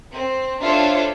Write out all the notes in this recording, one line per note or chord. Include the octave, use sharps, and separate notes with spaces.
C4
D4 E4 F4 A4 C5 C#5